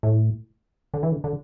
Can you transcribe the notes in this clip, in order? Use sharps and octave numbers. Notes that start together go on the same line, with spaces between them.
A2
D3
E3
D3
D3